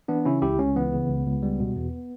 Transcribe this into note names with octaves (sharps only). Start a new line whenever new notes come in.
E3 B3 D4
C#3 C#4 E4
C#2 E4 G4
C#2 C#4
E3 B3
C#3
C#2
C#2
G3
B2
E2